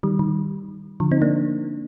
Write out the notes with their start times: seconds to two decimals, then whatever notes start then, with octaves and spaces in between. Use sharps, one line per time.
0.03 D#3 G3
0.19 D#3
1.00 D3 F3
1.11 C4 D#4
1.22 A#3 D4